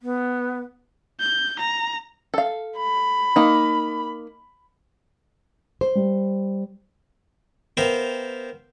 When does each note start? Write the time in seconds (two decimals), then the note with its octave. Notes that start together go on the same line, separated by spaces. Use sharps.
0.02 B3
1.20 G6
1.60 A#5
2.34 A4 F5
2.78 B5
3.36 A#3 D#4
5.81 C5
5.95 G3
7.77 B3 A#4 C5 E5 F5 G5